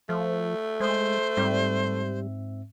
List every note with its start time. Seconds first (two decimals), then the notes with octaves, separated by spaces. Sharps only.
0.09 F3 A3
0.80 G#3 C5
1.37 G#2 G3 C4 E5